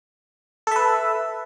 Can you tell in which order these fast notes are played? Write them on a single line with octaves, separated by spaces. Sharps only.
A4 E5 B4